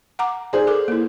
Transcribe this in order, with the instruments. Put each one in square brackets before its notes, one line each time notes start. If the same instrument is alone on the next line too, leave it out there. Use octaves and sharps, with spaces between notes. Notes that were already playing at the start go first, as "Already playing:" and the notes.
[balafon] F#5 A#5 D6
[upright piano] G#4 C5 [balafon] D5
[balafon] A4 A#4 D6
A#3 E4